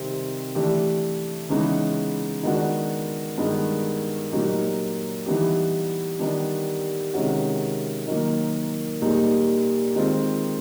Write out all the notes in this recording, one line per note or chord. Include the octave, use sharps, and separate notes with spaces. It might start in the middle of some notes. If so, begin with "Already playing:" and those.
Already playing: C3 D#3 G3 C4 D#4
E3 A3 D4 G4
C#3 E3 G#3 B3 D#4
D#3 G#3 B3 D4 F#4
G2 D#3 G#3 B3
A#2 F#3 A#3 D#4 G4
E3 G3 B3 D#4 G4
D#3 G3 B3 D4 G4
C3 D#3 G#3 C#4 F#4
D#3 F#3 A#3
A#2 G3 A#3 D#4 G#4
D#3 G#3 C4 F4